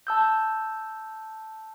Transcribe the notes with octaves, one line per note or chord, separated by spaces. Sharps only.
A5 E6 G6